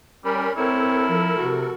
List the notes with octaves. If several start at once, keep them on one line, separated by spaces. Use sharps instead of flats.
G3 C#4 A#4 B5
C4 E4 A4 A#4 C#5
F3
C3 F#4